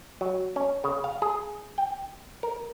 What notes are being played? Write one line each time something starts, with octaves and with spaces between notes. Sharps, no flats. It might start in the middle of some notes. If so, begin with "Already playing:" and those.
F#3
C#4
C#3
F5
G#4
G5
A#4